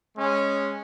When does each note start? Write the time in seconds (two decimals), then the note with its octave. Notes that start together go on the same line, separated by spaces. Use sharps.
0.15 G#3 C#4